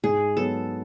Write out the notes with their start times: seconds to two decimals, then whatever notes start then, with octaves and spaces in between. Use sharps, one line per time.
0.04 G#2 G#4
0.37 F#3 B3 A4